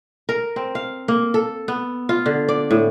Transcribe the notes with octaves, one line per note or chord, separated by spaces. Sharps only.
A#4
C4
F5
A#3
A4
B3
F4
D3
D5
A2